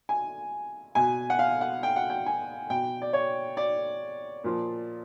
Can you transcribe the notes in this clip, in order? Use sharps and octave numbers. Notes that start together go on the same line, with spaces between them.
G#5
B2 G#5
F#5
F5
F#5
G5
F#5
G5
G#5
B2 G5
D5
C#5
D5
A#2 F3